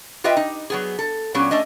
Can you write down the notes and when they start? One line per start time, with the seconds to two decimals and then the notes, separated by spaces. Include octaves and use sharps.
0.24 F4 G4 B4 D#5 E5 G5
0.37 D#4
0.70 F#3 B3 G#4
0.99 A4
1.34 A#2 F#3 B3 C#4 G4
1.51 A3 C#4 D4 D#5